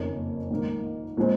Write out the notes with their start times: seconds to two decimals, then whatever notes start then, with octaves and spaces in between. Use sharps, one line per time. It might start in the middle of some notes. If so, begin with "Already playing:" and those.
Already playing: F#1 F2 D#3 A#3 C#4
0.50 A#1 G#2 D#3 A#3
1.17 A#2 F3 G#3 C4